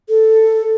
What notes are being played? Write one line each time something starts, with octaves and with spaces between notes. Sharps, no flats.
A4